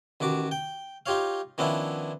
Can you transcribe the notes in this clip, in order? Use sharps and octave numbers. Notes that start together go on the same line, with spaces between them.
A1 D#3 F#4 D6
G5
D#4 F4 G4 C#5 F5
D#3 F3 B3 C#4 D4 E4